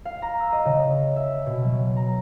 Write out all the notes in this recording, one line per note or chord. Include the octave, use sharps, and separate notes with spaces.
F5
A#5
E6
D#5
C#3
E5
B2
F#3
A#5